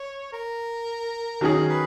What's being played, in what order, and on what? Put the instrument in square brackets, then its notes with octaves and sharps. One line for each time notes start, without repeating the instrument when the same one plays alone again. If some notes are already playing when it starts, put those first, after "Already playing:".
Already playing: [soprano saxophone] C#5
A#4
[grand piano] D#3 F#3 C#4 G#4 [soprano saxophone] A#4
[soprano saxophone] B4